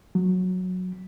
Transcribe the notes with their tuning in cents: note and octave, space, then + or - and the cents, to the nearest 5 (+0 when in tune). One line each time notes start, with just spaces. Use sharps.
F#3 -10